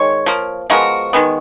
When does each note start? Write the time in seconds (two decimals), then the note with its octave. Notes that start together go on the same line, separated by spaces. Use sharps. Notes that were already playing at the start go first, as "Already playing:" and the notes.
Already playing: D#3 G#3 C#5
0.26 F3 A#3
0.70 F3 G#3 B3 F#4 A#4
1.13 D#3 G#3 B3